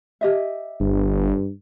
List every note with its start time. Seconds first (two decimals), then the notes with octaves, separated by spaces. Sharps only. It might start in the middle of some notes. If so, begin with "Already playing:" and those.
0.21 G4 D#5 E5
0.80 G1 G2